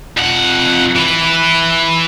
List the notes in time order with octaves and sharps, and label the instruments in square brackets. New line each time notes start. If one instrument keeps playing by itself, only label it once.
[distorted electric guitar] F2 F#5
E3 B4